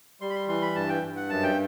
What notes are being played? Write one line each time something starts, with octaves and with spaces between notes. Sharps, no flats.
G3 C6
B5
C6
E3 C6
B5
G2 A5
G5
G2
F#5
F#2 A5
G5